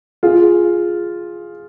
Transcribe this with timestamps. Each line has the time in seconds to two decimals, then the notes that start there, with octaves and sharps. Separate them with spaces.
0.23 F4 G#4